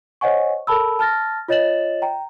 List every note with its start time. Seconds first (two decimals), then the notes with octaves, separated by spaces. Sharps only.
0.21 C5 C#5 D#5 F#5 G#5 C#6
0.67 A4 A#4 A5 B5 E6
0.99 A5 F6 A6 A#6
1.48 F4 C#5 D#5 A6 E7 F#7
2.02 G5 A#5